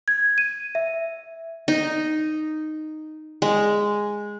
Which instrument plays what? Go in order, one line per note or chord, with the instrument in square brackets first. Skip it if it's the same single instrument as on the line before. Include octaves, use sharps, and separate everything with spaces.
[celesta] G#6
D#7
E5
[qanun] D#4
G#3